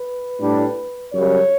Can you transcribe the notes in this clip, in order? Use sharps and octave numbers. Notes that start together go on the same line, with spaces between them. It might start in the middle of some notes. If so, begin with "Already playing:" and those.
Already playing: B4
A2 G3 D4
F#2 C#3 G3 C#5